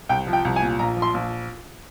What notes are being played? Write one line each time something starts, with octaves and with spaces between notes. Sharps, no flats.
C2 G5
F3
G5
C2
G#5
A#2
A#1 A#5
F3
C6
A#1